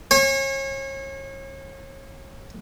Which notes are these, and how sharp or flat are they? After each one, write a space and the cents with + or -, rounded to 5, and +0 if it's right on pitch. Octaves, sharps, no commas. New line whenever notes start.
C#5 -35 G#5 -25